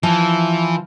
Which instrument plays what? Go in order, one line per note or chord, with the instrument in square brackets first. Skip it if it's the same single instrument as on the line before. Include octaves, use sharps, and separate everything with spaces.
[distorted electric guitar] E3 [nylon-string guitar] F3